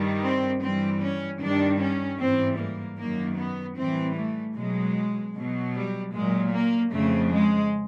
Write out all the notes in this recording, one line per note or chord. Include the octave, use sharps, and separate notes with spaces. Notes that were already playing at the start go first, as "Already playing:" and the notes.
Already playing: G2 D#3 G3
C4
G2 E3 G3 C4
C#4
G2 D#3 G3 D4
C#4
G#2 E3 G3 C4
A#3
F#2 D#3 F#3 A#3
B3
A2 E3 G3 C4
A3
B2 F#3 G#3
B2 F#3
G3
A#2 F#3 G#3
A#3
F2 C#3 F3 A3
G#3